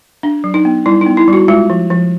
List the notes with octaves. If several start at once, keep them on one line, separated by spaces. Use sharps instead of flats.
D4
F#3
D#4
B3
G3 E4
D#4
B3
E4
G3 F#4
G#3 F4
F3
F3